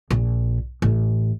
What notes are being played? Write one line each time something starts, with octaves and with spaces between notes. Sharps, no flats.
A#1
A1